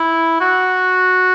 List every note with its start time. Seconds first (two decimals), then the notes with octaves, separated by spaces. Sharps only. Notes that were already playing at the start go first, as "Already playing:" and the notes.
Already playing: E4
0.40 F#4